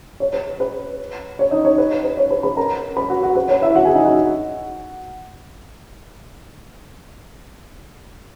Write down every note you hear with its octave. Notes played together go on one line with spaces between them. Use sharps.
C#5
B4
B4
C#5
D#4 D#5
C#5
B4
B4
C#5
B4 B5
B4 B5
A#4 A#5
B4 B5
F#4 F#5
F#4 F#5
B4
C#5
E4 E5
F#4 F#5
G#4 G#5
D#4 D#5
F#4 F#5